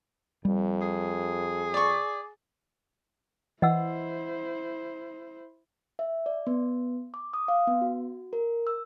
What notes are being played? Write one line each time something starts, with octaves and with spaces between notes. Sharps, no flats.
F2 G3
G#4
D5 C#6
E3 E4 C5 D#5 F#5 E6
E5
D5
B3
D6
D#6
F5
B3
F#4
A#4
E6